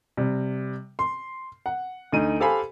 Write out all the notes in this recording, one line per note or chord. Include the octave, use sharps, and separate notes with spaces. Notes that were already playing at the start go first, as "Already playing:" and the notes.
C3 G3
C6
F#5
D2 D#4 D#7
G4 A4 C5 F5 G#5 B5